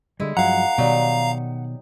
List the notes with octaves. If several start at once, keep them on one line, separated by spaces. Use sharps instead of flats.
D3 G3 G#3 E4
G2 F3 F#3 F5 F#5 A#5
B2 D#3 F#3 G3 D#4